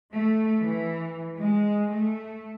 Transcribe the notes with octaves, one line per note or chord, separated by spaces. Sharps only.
A3
E3
G#3
A3